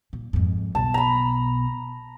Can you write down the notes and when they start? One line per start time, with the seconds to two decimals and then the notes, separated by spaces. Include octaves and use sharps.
0.13 A#2
0.33 F2 G#2
0.75 B1 B2 A5
0.94 A#5 B5